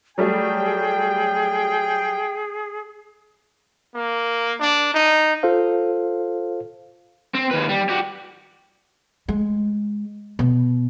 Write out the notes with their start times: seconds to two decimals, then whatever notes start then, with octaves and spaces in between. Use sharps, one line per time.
0.18 F#3 G3 A3 G#4 G5
3.95 A#3
4.60 D4
4.94 D#4
5.43 F4 A4 C5 F5
7.35 C4
7.51 D#2 B4
7.69 G3
7.89 F#4 G4
9.29 G#3
10.39 B2